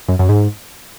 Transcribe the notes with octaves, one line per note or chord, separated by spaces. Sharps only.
F#2
F#2
G#2